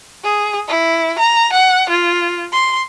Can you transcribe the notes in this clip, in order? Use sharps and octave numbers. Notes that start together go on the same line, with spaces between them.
G#4
E4
A#5
F#5
F4
C6